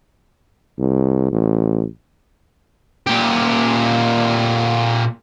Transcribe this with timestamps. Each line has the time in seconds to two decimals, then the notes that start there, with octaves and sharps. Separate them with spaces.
0.79 C2
1.31 A1
3.07 A#2 G4